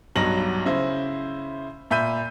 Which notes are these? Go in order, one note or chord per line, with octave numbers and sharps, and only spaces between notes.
B1 G2 F#3 A#6 F#7
C#3 E4 C5
A#2 E5 B5 G6 D#7